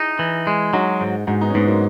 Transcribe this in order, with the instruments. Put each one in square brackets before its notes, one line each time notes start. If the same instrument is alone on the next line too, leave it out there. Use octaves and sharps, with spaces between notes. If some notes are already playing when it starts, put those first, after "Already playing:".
Already playing: [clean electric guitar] D#4 [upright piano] E4 G#4
[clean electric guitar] E3
G#3
[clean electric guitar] F#3 [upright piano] D#4 F#4
[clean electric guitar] G#2
[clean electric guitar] G#2 [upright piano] D#4 F#4
[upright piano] B3 D#4
C#4
[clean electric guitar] G#2 [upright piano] G#3 B3
[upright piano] F#3 A#3